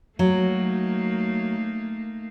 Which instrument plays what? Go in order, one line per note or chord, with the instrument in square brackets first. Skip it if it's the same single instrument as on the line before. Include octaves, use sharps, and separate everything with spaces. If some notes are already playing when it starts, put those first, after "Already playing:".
[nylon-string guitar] F#3 [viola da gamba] A3 A#3 D#4